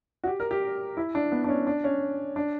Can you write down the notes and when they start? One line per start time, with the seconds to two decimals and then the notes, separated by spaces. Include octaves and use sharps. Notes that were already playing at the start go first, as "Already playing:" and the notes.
0.24 F#4
0.27 G4
0.40 A#4
0.51 G4
0.97 E4
1.15 D4
1.32 B3
1.44 D4
1.49 C#4
1.67 D4
1.84 C#4
2.36 D4